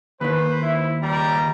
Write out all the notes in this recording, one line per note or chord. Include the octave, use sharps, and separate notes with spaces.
D#2 D#3 B4 C5
E4
C#2 G3 A#5